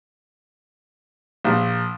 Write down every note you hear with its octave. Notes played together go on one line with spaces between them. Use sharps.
A#1